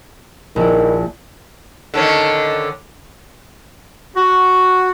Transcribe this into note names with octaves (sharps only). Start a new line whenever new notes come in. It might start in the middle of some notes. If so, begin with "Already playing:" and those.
A#1 D#3 E4
D3 D#3 C#4
F#4